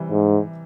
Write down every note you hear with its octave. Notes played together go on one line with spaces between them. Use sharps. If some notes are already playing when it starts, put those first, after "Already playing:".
Already playing: C3 E3 G3
G#2